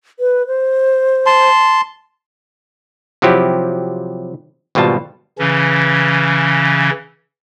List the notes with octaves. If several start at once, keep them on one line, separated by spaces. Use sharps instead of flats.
B4
C5
A5 C6
C3 F3 F#3 C4 E4 G4
G#1 B2 G3 F4 A5
C#3 E3 C#4